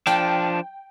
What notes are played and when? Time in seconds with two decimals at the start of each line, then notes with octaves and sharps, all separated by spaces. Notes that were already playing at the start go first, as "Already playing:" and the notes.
0.07 F3 D4 G5